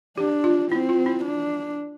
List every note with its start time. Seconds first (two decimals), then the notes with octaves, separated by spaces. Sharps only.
0.18 D4 G4
0.44 F4
0.71 C4 E4
0.89 F4
1.06 E4
1.24 D4